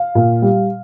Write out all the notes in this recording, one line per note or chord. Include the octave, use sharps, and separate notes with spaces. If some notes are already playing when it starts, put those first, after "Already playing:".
Already playing: F5
A#2
G3